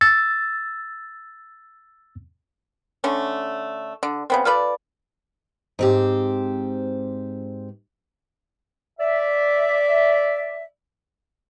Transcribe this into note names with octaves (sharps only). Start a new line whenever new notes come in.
E6 A6
D3 A3 C#4
D3
C#3 B3 C4
F4 A4 B4 D5
G#2 C4 G4
D5 E5